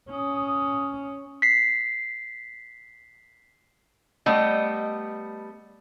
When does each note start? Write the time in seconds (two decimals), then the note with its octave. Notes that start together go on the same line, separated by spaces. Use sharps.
0.11 C#4 D#6
1.42 B6 C7
4.26 G3 A3 B3 D#5